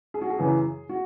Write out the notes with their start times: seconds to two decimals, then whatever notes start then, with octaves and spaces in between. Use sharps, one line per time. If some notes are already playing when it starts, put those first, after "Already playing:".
0.14 G#4
0.21 F#4
0.30 G#4
0.39 F#2 C#3 E3
0.89 F#4